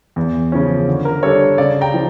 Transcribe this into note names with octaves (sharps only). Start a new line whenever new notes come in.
E2
C#3 F3 C#4
D3
A#4
G3 D4 A4 C#5
C#3 D5 F5
G5 A#5
F3